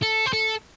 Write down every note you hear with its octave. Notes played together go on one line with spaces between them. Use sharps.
A4
C5
A4